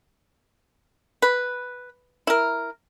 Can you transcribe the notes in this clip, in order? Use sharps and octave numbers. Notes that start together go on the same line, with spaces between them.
B4
E4 A#4